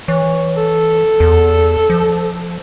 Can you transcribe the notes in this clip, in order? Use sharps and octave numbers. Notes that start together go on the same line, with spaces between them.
E3 C#5
A4
E2
F3